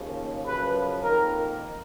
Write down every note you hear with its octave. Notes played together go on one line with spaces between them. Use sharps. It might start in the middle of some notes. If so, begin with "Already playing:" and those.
Already playing: D#2 C#3 F3
F#2 C#3 F3 B4
F2 D#3 A#3 A#4